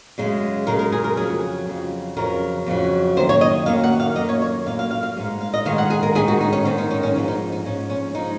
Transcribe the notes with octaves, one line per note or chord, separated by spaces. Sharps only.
F#2 C#3 G#3
F#2 C#3 G#3 A#4
A#4
G#4
A#4
F2 C#3 F#3 G#4
F2 C#3 F#3
F2 C#3 F#3 A#4
F2 C#3 F#3
F#2 D#3 A#3 C5
C#5
D#5
F#2 D#3 A#3 F5
F#5
F5
F#2 D#3 A#3 D#5
C#5
C#5
F#2 D#3 A#3 F5
F5
F5
F5
G#2 D#3 G#3
F5
D#5
G#2 D#3 G#3 F5
F#5
G#4
A#4
G#2 D#3 G#3 G#4
F#4
D#4
C#4
G#2 D#3 G#3 C4
D#4
C#4
C#4
G#2 F3 G#3 C4
D#4
D#4
G#2 F3 G#3 C#4
C#4
F3 G#3 D#4